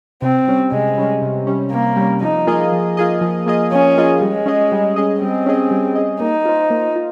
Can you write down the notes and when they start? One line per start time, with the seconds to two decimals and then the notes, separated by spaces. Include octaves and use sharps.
0.22 C3 C4
0.48 G3 C#4
0.72 C3 G#3
0.98 G3 C#4
1.22 C3
1.47 G3 C#4
1.72 C3 A#3
1.97 G3 C#4
2.22 F3 D#4
2.47 A#3 F4 G#4 D#5
2.72 F3
2.97 A#3 F4 G#4 D#5
3.21 F3
3.46 A#3 F4 G#4 D#5
3.72 F3 C#4
3.97 A#3 F4 G#4 D#5
4.21 G3 G#3
4.46 C#4 G#4 D#5
4.72 G3
4.96 C#4 G#4 D#5
5.21 G3 C4
5.46 C#4 G#4 D#5
5.71 G3
5.95 C#4 G#4 D#5
6.20 A#3 D#4
6.45 F4 C5
6.70 A#3
6.96 F4